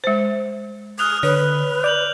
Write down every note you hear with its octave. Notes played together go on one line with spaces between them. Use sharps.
G#3 C5
D#6 F6 F#6 F7
D3 B4 C#5
D5 G6 F7 F#7